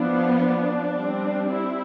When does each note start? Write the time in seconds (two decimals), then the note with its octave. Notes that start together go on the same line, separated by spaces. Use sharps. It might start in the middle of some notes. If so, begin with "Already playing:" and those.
Already playing: F3 B3 D4 E4
0.41 D4
0.96 G3 C4
1.51 E4